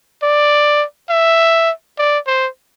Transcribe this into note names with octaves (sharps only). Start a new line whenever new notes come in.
D5
E5
D5
C5